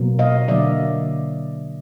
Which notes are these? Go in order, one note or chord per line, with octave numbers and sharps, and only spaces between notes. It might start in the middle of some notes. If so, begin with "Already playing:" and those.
Already playing: B2 F#3 A#3
D#5 F5
D3 F#3 A#3 D5 E5